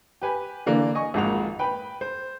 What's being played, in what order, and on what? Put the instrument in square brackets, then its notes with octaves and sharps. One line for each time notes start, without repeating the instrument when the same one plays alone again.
[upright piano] G4 B4 G#5
D3 E3 A#3 D4
D#5 G#5 C#6 D#6
G#1 F2 G#3 A#3 F#5 F7
B4 G5 B5
C5